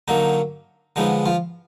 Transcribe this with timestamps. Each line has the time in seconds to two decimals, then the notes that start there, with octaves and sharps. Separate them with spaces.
0.08 D3 F#3 A#3 D#4
0.96 D3 F3 G#3 B3 D#4
1.26 F3 F4